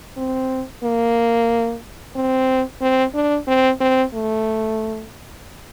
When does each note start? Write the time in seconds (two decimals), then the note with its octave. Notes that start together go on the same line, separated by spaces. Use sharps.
0.17 C4
0.83 A#3
2.16 C4
2.81 C4
3.14 D4
3.47 C4
3.81 C4
4.14 A3